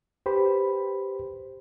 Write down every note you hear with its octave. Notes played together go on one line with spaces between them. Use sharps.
G4 B4 C5 B5